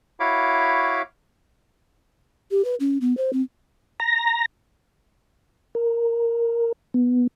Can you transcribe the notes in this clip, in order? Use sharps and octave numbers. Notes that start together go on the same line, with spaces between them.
E4 F#4 C#5 F5 B5 D6
G4
B4
C#4
B3
C5
C4
A#5
A#4
B3